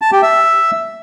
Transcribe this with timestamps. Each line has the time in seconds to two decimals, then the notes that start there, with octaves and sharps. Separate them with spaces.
0.01 A5
0.12 G4
0.22 E5